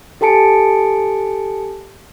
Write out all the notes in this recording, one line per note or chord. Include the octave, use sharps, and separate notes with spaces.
G4 A4 G#5 A5 C#7 D7